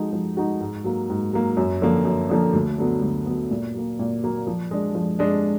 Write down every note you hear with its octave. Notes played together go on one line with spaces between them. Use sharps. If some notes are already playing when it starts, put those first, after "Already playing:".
Already playing: F3 G#3 D#4 F#4
F3
G#3 D#4 F#4
G#2
F#3 A#3
G#2
F#3 A#3
F#2
D3 F3 A#3
F#2
D3 F3 A#3
D2
D3 F#3 B3
D2
D3 F#3 B3
A#2
F#3 A#3
A#2
F#3 A#3
F3
G#3 D4
F3
G#3 D4